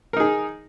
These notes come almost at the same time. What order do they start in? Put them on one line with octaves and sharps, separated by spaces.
A#4 D#4 G#4